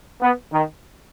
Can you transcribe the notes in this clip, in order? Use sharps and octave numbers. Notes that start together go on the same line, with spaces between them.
B3
D#3